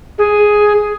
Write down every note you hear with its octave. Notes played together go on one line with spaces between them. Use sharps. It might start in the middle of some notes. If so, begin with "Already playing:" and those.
G#4